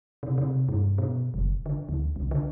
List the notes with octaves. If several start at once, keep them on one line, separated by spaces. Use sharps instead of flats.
C3
C3
G2
B2
F#1
D3
D2
C2
D3